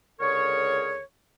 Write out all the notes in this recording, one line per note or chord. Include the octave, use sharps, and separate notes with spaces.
C#2 D3 G#4 A#4 C#5